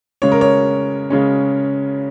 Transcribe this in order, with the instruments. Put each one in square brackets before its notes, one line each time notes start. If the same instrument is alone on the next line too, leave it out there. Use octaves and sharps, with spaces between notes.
[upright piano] C#3 G#3 C#4 C#5
A#4
C#5
C#3 G#3 C#4